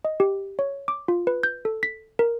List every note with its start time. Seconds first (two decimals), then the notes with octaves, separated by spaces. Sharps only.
0.05 D#5
0.20 G4
0.59 C#5
0.88 D6
1.08 F4
1.27 B4
1.43 G6
1.65 A4
1.83 B6
2.19 A#4